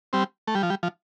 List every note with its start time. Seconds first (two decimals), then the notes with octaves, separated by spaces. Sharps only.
0.13 G3 C4
0.47 A3
0.55 G3
0.63 F3
0.70 G3
0.83 F3